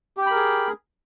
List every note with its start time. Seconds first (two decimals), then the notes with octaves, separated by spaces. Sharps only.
0.17 G4
0.22 G5
0.26 B5
0.31 A#4
0.35 G#4